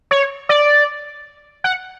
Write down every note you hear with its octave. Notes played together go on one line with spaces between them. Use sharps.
C#5
D5
F#5